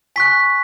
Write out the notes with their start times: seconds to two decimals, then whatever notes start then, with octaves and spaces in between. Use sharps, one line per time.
0.16 G#5 C#6 F#6 B6